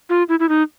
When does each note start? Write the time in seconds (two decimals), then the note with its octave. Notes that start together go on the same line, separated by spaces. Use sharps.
0.09 F4
0.29 E4
0.40 E4
0.49 D#4